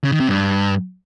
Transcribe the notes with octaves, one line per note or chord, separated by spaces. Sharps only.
C#3
D#3
C3
G2